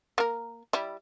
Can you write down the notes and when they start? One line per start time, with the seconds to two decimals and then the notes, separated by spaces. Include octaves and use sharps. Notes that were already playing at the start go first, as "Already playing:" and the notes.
0.18 A#3 A#4
0.73 G3 E4